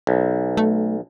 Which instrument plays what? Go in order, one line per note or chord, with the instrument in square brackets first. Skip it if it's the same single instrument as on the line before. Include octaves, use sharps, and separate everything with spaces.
[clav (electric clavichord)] B1
[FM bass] A3